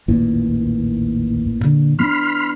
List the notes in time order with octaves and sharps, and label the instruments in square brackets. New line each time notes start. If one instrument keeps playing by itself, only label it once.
[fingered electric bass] A1 A#2 E3 [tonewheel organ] D#2
[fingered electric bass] A#2 D3
[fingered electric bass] E3 B3 D4 [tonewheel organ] B5 C6 F6